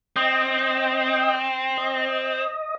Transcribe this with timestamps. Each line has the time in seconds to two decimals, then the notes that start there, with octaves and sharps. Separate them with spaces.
0.16 C4 D#5 G5
1.77 D#5